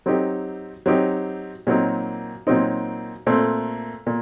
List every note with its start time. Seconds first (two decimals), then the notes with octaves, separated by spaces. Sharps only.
0.06 F#3 C4 D#4 G4
0.86 F#3 C4 D#4 G4
1.67 A#2 F#3 C4 D#4
2.47 A#2 F#3 C4 D#4
3.27 A#2 A3 C4
4.07 A#2